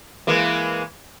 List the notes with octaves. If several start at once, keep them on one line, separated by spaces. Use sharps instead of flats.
E3 G#3 A#3